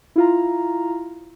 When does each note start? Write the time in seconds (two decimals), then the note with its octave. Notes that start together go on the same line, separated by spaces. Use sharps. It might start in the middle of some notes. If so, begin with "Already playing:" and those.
0.16 E4 F4 A#5